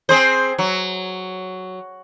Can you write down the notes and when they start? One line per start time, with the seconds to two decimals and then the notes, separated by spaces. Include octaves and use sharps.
0.09 C4 G#4 C5
0.59 F#3